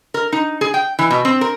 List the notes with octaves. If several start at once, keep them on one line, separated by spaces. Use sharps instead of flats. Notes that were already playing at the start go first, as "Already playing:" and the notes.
A#4
D#4
G#4
G5
E3
B2
C4
A#4